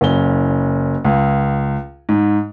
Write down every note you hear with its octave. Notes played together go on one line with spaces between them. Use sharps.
F#1 C#4 G7
C#2
G#2